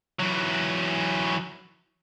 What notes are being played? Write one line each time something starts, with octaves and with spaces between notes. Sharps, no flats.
E3 F#3